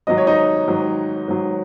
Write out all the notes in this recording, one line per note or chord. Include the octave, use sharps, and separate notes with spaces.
G#2 D#3 F#3 D#5
C#5
D#4 D#5
G#2 D#3 F#3
G#2 D#3 F#3